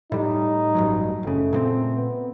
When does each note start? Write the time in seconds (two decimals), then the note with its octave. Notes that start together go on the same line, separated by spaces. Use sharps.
0.12 A2 G3 D#4
0.75 A1 G2 F#3
1.23 F#1 C#3 A3
1.53 A#2 G#3 C4
1.96 B3